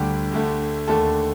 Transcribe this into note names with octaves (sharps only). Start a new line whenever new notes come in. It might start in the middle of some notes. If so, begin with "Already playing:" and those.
Already playing: D2 D3 G3 G4
D2 D3 A3
D#2 D3 A3 A4